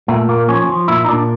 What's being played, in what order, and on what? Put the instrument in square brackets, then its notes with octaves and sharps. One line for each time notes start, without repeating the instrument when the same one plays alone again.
[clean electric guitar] A#2 A3
A#2 A#3
F3 C#4
F3
A#2 E4
D#4
A#2 D4